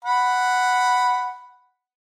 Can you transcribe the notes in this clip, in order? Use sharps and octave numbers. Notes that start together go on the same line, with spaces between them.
F#5 B5